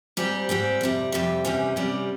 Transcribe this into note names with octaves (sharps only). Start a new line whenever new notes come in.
G#2 G3 C4 G4
G#2 G3 C4 G4
F2 C3 G3
F2 C3 G3
E2 C3 G3 C#4
E2 C3 G3 C#4